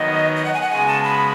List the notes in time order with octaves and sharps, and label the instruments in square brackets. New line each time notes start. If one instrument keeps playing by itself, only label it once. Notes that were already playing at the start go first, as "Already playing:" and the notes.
Already playing: [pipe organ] D#3 F#3 B3 [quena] D#5
[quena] D#5
F#5
G#5
F#5
[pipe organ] C#3 G#3 B3 F#4 [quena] G#5
[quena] A5
B5